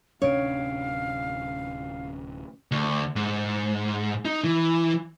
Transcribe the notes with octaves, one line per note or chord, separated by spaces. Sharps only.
D1 C3 C#4 D4 C#5 F5 D7
D2
G#2
D#4
E3